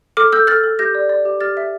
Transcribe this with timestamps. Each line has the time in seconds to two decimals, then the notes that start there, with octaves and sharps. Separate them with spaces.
0.17 A4 D6 F6
0.32 A4 E6 G6
0.47 A4 F6 A6
0.64 A4
0.79 G4 G6 A#6
0.95 D5
1.09 D5
1.25 G4
1.41 G4 F6 A6
1.57 E5